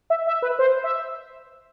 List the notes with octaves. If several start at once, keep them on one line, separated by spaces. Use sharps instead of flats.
E5
E5
B4
C5
E5